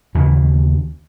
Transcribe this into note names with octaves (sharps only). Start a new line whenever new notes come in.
D#2 C#3 E3